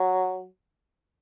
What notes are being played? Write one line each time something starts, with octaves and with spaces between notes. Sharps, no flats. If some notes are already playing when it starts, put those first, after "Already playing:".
Already playing: F#3